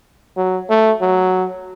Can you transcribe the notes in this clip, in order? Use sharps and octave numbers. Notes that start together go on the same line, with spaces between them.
F#3
A3
F#3